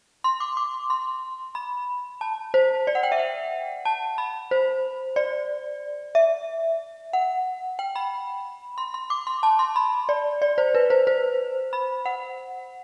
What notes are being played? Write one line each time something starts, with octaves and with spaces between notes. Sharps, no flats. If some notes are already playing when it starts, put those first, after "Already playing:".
C6
D6
D6
C6
B5
A5
C5
D5
F#5
G5
E5
F#5
A5
B5
C5
D5
E5
F#5
G5
B5
C6
C6
D6
C6
A5
C6
B5
D5
D5
C5
B4
C5
C5
B5
F#5